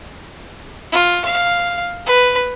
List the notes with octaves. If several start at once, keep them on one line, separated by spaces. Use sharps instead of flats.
F4
F5
B4